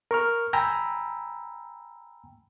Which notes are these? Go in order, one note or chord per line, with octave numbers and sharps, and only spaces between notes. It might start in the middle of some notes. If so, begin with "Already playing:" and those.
A#4 C#6 F6
G5 G#5 A#5 B5 E6